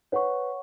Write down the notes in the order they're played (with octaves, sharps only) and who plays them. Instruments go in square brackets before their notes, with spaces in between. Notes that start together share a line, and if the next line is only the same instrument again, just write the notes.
[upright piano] B4 [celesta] C#5 F#5 C#6